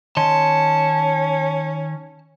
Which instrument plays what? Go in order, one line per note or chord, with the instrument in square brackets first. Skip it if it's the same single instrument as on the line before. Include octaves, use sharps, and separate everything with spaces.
[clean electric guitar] D#3 D#5 C6 [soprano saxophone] C#4 [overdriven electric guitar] A5